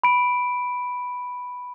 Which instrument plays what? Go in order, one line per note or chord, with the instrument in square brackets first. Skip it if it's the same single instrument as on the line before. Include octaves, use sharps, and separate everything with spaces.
[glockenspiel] B5 D7